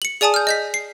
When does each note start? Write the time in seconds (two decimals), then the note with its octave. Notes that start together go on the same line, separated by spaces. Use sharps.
0.02 C#7 F#7
0.21 G#4 D5 G#5 A5 D#6
0.34 F6 G6
0.47 D#5 G6 B6
0.74 C7